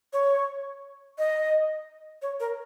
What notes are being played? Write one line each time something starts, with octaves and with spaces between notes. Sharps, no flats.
C#5
D#5
C#5
A#4